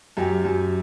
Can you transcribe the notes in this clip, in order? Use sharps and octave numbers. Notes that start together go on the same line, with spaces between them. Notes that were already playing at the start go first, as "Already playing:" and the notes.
F#2 G4
F#2